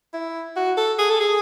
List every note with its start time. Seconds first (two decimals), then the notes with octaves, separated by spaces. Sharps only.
0.13 E4
0.56 F#4
0.77 A4
0.99 G#4
1.10 A4
1.20 G#4